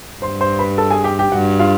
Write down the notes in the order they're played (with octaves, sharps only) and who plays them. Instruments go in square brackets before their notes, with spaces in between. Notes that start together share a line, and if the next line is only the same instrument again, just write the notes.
[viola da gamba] G2 [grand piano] C5 C6
[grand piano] C5 C6
B4 B5
A4 A5
G#4 G#5
G4 G5
G4 G5
[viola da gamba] G2 [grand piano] F#4 F#5
[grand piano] F4 F5